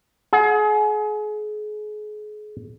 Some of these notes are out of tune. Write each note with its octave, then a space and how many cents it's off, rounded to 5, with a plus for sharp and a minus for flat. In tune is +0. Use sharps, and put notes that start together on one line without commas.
G#4 +35 F#5 -20